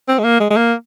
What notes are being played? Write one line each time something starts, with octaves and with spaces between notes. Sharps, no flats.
C4
G#3
A#3
G#3
G#3
A#3